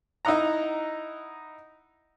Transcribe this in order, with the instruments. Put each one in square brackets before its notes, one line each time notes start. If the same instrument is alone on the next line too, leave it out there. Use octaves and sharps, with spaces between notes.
[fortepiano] D#4 E4 D#5 F#5 A#5